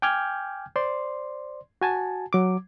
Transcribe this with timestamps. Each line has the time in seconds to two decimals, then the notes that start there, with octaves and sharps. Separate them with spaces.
0.02 G5 G#5 D6 F6 G6 G#6
0.76 C5 D5 C6
1.81 F#4 G#5 A5
2.33 F#3 D6